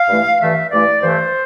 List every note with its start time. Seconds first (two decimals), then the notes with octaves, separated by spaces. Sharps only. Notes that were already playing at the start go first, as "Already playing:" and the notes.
Already playing: F5
0.09 G2 E3 A3
0.40 G2 E3 A3 E5
0.71 G2 E3 A3 D5
1.02 G2 E3 A3 C5